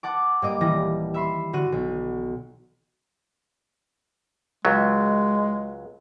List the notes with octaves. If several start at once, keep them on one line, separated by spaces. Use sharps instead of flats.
F#5 A5 D6
G2 A#3 D#5 D6
D#1 E3 G3 A#6
E5 B5 C6
D3 F#4 F#6 D#7
B1
C#2 F#3 G#3